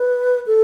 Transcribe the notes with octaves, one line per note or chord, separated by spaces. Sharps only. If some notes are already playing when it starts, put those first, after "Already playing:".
Already playing: B4
A4